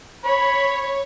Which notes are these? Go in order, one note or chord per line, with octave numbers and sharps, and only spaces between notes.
C#5 B5